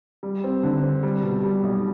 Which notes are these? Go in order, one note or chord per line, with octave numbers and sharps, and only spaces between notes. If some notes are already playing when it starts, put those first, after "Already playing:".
G3
C4
D3
C4
G3
B2
G3
B1